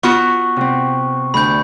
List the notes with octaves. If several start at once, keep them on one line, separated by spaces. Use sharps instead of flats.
B3 F4 F#4 C#6
C3 C4
D2 B5 G6